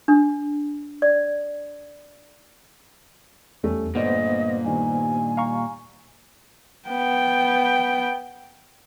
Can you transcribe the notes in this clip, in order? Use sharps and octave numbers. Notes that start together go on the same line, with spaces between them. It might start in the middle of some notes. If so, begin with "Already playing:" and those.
D4
D5
E2 G3 A3 C#4
G1 A#2 A3 B3 C5 D5 D#5
G2 D#3 G#5
F5 A#5 C#6
B3 G5